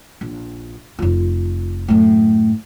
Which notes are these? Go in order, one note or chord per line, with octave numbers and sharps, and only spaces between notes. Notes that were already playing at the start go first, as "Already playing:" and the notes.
A#1
F1 F4
F#2 A2